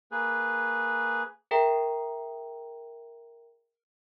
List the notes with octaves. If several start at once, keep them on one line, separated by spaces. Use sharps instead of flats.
A#3 G#4 B4
G#4 A#4 E5 G5 A#5